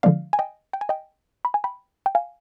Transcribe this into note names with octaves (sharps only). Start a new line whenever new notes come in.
D3 F3 G#3 B3 D5 F5
G#5
D#5 G5
G5
G#5
D#5 G5
B5
G#5
G5 B5
G5
F5 G#5